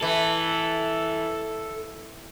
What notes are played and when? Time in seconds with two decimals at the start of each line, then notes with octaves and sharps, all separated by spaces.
0.02 E3 A4